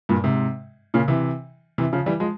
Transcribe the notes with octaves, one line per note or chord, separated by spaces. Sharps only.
G2 A#2
G#2 C3
A#2 C#3
C3 E3
C3 E3
C#3 F3
E3 G3
F3 G#3